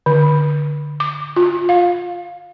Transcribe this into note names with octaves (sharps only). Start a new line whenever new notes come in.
D3
D6
F4
F5